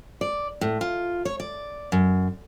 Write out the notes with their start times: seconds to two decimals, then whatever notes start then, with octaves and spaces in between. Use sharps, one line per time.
0.21 D5
0.61 A2
0.81 F4
1.25 C#5
1.40 D5
1.92 F#2